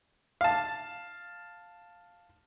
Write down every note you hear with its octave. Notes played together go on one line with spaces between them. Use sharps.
F5 A5